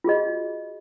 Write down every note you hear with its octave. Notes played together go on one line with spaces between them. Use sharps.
F4 F#4 G#4 D#5